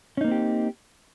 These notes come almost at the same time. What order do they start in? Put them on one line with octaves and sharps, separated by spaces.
C#4 D#4 A#3 C4 G4